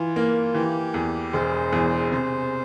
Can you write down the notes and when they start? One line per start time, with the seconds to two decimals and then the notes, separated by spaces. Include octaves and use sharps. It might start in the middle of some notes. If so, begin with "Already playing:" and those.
Already playing: E3 F4
0.16 A#3
0.54 E3 G4
0.94 E2
1.33 E1 C5
1.73 E2
2.12 C3 C5